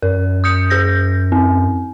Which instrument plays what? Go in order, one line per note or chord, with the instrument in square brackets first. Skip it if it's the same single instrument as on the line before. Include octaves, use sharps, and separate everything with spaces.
[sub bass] F#2 [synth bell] A#4
[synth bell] D#6 G6 C#7
G#4 G6 A#6
C4